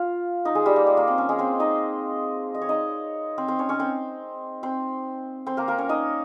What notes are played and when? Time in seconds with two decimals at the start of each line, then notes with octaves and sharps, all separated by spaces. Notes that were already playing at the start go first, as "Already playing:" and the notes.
Already playing: F4 F5
0.45 D#4 D#5
0.55 G#3 G#4
0.66 G3 G4
0.76 A#3
0.87 G#3
0.97 A#3
1.08 C4
1.18 C#4
1.29 G#3 G#4
1.39 C4 C5
1.60 D#4 D#5
2.54 D#5
2.61 C#5
2.69 D#4 D#5
3.38 C4 C5
3.48 C4 C5
3.59 C#4 C#5
3.69 C#4 C#5
3.79 C4 C5
4.63 C4 C5
5.46 C4 C5
5.57 A#3 A#4
5.68 A#3 A#4
5.78 C#4 C#5
5.89 D#4 D#5